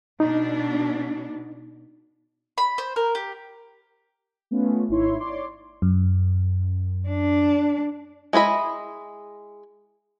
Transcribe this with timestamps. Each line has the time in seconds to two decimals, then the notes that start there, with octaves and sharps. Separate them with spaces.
0.20 B2 D4 D#4
2.58 B5
2.78 C5
2.96 A#4
3.15 G4
4.51 A3 B3 C#4 F4
4.88 G#1 D#4 E4 C#5 C6
5.19 C#5 D5 C6 D6
5.82 F#2
7.09 D4
8.33 G#3 E4 D#5 B5